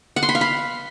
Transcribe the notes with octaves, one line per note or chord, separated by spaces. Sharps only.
F#5
C6
B5
F5
B5